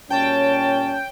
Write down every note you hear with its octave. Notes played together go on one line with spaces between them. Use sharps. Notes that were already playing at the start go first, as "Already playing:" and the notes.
A#2 G3 C#4 C#5 G5 A5